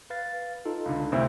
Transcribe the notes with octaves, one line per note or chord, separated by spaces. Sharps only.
B4 F5 A6
D#4 F4 A4
C#2 D3
D2 C3 A3 C4 E4